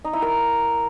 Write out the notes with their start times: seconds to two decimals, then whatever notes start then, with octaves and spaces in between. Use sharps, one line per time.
0.04 D#4
0.13 E4
0.22 A#4